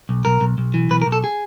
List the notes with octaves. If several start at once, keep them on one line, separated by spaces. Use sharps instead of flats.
B1
B1 A#4
B1
B1
E3
B1 B4
A#4
B1
A4
G#4